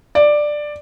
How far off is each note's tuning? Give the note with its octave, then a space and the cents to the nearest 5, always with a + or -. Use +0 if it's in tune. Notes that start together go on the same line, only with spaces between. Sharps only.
D5 +10